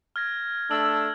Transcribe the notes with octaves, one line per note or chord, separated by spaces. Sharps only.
F6 G#6 A#6
A3 D4 E6 F#7